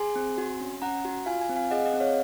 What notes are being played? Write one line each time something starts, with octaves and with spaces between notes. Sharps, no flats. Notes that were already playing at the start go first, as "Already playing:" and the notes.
Already playing: G#4 G#5 C6
C4
F#4
C#4
C#4 F#5 A#5
F#4
F4 F5 G#5
F5 G#5
C4
F5 G#5
G#4 D#5 F#5
D#5 F#5
C4
C#5 F5